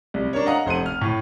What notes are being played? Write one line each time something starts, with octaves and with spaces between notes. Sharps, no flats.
C2
D4 A#4 C#5
D#5 F5 F#5 A#5 D#6
F1 C5 F#5 D#7
F6
A2